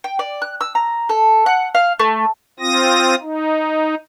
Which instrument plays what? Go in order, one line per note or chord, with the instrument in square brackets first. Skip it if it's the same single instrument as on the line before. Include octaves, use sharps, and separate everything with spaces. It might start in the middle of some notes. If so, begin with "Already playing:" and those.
[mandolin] G5
D5
F#6
E6
A#5
A4
F#5
F5
A3
[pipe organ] C4 F4 D#6 A#6
D#4